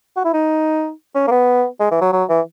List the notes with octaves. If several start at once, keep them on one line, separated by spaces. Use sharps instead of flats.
F#4
E4
D#4
C#4
A#3
B3
G#3
E3
F#3
F#3
E3